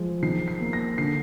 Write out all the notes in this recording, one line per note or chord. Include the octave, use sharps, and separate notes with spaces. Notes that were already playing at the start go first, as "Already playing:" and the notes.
Already playing: F3 G#3
D#3 C7
C7
A#3
A#6
D3 C7